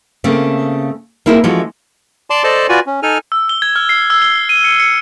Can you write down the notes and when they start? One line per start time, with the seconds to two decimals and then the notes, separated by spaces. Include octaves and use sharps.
0.24 C#3 A3 A#3 C4 C#4
1.26 A#3 C4 E4 G#4 A#4
1.44 E3 F3 G#3 A3 C#4 F#4
2.30 D5 A5 C6 D6
2.44 A4 C5 D5 D#5 A5
2.69 F4 F#4 B4 D5 G#5
2.87 C#4
3.03 D#4 A4 G#5 F6
3.32 E6
3.49 G7
3.62 G#6
3.76 F6
3.89 C7
4.10 E6
4.22 G7
4.49 D#7
4.64 C#7
4.80 C#7